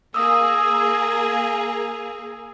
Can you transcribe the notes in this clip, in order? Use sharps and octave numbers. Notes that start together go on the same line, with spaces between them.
A#3 G#4 D#6 E6